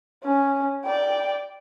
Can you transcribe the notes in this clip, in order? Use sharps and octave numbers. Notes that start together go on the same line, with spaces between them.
C#4
D5 G5